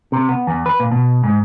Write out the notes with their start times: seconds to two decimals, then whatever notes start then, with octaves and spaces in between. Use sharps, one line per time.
0.12 C3
0.29 B3
0.47 E2
0.66 B4
0.80 A#2
0.92 B2
1.24 G#2